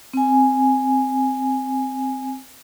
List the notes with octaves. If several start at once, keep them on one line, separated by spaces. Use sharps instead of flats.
C4 G#5